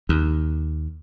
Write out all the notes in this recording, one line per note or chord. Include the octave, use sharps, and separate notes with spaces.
D#2